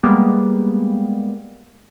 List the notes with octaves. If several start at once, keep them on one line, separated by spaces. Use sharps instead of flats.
G3 G#3 A#3 B3 G4